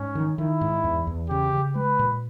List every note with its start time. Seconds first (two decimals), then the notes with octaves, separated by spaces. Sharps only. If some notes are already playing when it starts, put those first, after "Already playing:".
Already playing: G#2 C#4
0.15 D#3
0.38 D#3 E4
0.61 G#2
0.84 E2
1.07 E2
1.29 C#3 G4
1.53 C#3
1.75 G#3 B4
1.99 A#2